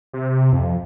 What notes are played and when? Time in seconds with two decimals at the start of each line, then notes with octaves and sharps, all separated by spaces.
0.13 C3
0.53 F2